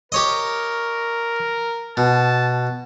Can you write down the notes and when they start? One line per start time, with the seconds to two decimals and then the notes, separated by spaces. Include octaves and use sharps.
0.12 G4 A#4 C#5 D#5
1.97 B2 A5